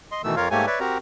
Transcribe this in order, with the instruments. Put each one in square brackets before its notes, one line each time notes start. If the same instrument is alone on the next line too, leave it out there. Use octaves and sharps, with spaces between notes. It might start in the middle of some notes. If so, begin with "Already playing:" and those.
[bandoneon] D#5 C6
B2 D#3 E3 A3 E6
F2 F4 A#4 C#5 F5
G#2 A3 A#3 G4 C#5 G#5
B4 C#5 D5 E5
C4 F#4 G4 A#4 A#5